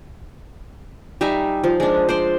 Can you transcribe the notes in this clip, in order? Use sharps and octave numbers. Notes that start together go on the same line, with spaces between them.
G3 D#4 E5 G#5
F3
G#3 D4
C5 D5 C6